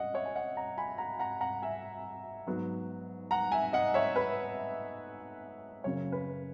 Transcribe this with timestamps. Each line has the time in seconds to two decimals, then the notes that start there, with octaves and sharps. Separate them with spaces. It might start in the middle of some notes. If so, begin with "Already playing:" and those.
Already playing: C#4 D#5 F#5
0.14 C#5 E5
0.25 G#5
0.35 D#5 F#5
0.57 F#5 A#5
0.78 G#5 B5
0.98 F#5 A#5
1.19 F#5 A#5
1.41 F#5 A#5
1.62 E5 G#5
2.47 G#2 F#3 B3
3.31 F#5 A#5
3.52 E5 G#5
3.73 D#5 F#5
3.94 C#5 E5
4.16 B4
5.84 F#2 C#3 F#3 A#3 C#4 C#5
6.12 B4